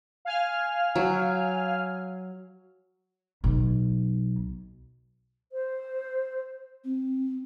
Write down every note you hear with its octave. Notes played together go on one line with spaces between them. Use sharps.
F5 G#5 F6
F#3
B1
C5
C4